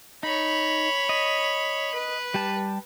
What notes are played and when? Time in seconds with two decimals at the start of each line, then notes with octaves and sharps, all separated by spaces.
0.23 D#4 C#5 B5
1.09 D#5
1.94 B4
2.34 G3 G4 A5